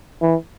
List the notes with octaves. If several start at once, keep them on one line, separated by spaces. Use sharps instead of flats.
E3